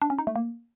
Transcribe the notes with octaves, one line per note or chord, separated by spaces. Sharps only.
D4
C#4
D#4
A3
A#3